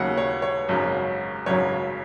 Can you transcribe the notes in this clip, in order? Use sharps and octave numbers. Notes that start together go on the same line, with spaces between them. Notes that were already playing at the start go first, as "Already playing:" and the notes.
Already playing: D#2 C#3 F#3 F#5
C#5
C#5
G#1 F#2 C#3 F#3
G#1 F#2 C#3 F#3 C#5